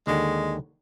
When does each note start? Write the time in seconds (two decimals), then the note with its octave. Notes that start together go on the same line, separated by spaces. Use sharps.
0.07 D#2 D3 D#3 G#3